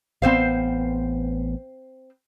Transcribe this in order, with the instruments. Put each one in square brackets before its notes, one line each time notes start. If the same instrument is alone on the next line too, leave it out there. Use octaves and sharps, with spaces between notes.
[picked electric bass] A1 B3 [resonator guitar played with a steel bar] C4 C5 F5